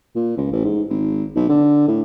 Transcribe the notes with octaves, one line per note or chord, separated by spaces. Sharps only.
A#2
C#2
A1
G#2
G#1
B1
D3
A2